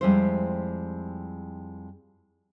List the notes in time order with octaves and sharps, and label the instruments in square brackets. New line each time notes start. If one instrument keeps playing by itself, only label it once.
[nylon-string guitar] F2 G3 G#3 E4 G4 C5